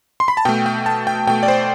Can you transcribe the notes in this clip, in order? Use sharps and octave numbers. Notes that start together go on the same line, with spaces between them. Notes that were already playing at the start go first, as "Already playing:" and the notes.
C6
B5
A5
B2 A3 G5
G5
A5
G5
B2 A3 G5
D5
C5